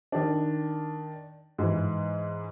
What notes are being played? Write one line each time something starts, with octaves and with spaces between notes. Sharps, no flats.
D#3 D4
G#2 E3